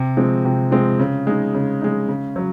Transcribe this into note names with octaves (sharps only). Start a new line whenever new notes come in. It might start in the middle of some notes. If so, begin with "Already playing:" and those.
Already playing: C3
F3 G#3 C4
C3
F3 G#3 C4
C#3
G#3 D#4
C#3
G#3 D#4
C#3
F#3